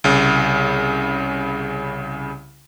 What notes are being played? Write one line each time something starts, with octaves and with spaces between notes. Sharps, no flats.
C2 C#3